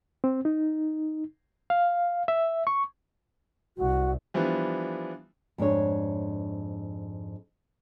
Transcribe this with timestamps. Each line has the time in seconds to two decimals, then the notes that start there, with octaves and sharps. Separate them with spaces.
0.24 C4
0.45 D#4
1.70 F5
2.28 E5
2.67 C#6
3.78 C2 F#4
4.34 E3 F3 G3 B3 D4
5.58 F2 G#2 D4 C#5